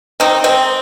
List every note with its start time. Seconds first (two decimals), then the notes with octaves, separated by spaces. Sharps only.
0.20 D#3 C4 D#4
0.44 G#3 C4